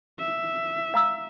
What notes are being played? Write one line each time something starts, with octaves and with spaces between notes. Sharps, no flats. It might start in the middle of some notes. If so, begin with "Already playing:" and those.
E5
F5 A#5 E6